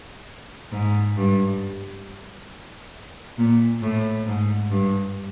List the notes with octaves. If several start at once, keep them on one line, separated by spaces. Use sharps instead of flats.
G#2
G2
A#2
A2
G#2
G2